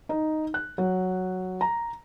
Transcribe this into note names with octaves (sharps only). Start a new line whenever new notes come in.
D#4
F#6
F#3
A#5